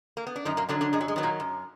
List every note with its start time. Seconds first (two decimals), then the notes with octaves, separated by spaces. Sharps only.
0.17 A#3
0.27 B3
0.36 D4
0.45 F#2 D#3 D#4
0.57 A#2 A#3
0.69 D3 D#3 F#3 D4
0.81 D3 D4
0.93 F#2 G#3
1.01 F#3
1.08 G#3
1.16 D#3 F#3 B3
1.23 A#2 A#3
1.40 F#2